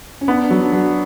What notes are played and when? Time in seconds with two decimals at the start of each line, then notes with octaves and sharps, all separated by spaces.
0.21 C#4
0.28 B3 D4
0.50 F#3
0.61 D4
0.72 F#3